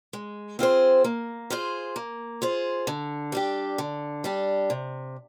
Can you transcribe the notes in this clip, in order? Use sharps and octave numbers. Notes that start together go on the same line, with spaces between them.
G#3
C4 F4 G#4 C5
A#3
F4 G#4 C5
A#3
F4 G#4 C5
D3
G3 D4 G4
D3
G3 D4 G4
C3